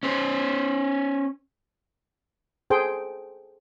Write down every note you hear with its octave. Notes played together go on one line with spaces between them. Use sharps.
C#4 C5
G#4 A4 C5 G5